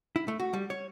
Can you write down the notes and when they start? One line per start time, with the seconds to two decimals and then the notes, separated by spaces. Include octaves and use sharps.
0.16 E4
0.28 A3
0.40 F#4
0.53 G3
0.70 C#5